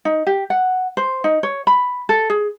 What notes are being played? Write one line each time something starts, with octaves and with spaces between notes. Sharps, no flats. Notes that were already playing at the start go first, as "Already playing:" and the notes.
D#4
G4
F#5
C5
D#4
C#5
B5
A4
G#4